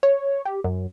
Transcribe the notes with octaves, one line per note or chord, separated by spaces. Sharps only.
C#5
G4
F#2